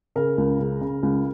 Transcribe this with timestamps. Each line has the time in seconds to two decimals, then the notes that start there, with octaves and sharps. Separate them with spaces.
0.16 C#3 A#4
0.38 C#2
0.59 C#3
0.81 C#3
1.03 C#2